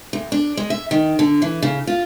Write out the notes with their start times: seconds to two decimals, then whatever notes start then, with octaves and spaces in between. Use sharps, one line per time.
0.13 D2
0.32 D4
0.57 G#3
0.70 E5
0.91 D#3
1.19 D3
1.42 E3
1.63 C#3
1.87 F4